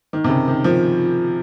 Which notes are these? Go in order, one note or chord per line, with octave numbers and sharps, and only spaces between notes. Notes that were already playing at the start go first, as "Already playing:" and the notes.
D#3
C3
C#3
D#3
F3